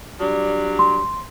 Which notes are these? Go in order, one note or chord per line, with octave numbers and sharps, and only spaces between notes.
F#3 G3 D4
C6